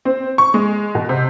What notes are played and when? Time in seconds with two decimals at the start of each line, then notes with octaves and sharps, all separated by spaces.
0.05 C4
0.38 C#6
0.54 G#3
0.95 B2
1.09 C3